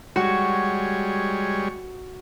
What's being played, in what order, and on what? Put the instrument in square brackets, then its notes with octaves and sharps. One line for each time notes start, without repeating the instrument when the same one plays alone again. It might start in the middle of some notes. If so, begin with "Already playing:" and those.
[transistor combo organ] G3 G#3 C#5 [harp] F#4